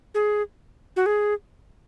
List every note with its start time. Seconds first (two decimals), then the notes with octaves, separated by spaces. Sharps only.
0.14 G#4
0.96 F#4
1.06 G#4